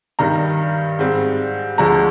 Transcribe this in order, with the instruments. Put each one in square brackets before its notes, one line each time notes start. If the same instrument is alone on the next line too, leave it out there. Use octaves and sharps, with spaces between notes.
[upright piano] G2 D#3 G3 A#5
G#2 G3 C4
D2 D3 F3 G#3 A#5